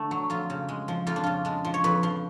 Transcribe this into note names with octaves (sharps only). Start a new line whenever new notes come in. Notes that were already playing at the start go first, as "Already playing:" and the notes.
Already playing: D3 A3
F#3
F2 F4
C#3
G#3
F3
F2 F4
D4
C#3 F4
G#3 D4
F3
C#5
F2 B4
F3